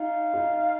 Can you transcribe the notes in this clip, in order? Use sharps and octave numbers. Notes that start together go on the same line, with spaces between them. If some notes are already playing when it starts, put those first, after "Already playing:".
Already playing: D#4 F5
D#4